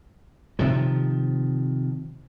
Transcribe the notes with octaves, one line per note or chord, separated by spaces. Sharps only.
C3 D#3 F3